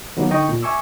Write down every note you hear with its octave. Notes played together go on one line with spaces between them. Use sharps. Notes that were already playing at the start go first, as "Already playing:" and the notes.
D#3 F#3 A#3 B3
D3 D#4 D#5 G5 C#6
A#2
E5 G#5 C#6 D6 E6